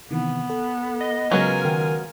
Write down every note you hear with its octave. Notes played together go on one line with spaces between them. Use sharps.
C3 D#3 E3 B3
A4
D#5
C#3 F#3 G#3 B3 F4 A#4 G#5
D#3